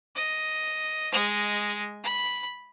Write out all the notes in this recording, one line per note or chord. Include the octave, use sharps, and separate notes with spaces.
D#5
G#3 D#5
B5